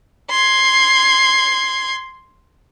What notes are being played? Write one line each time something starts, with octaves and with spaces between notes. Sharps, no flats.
C6 G#6